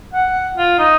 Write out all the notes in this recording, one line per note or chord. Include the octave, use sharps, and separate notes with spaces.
F#5
F4
D#4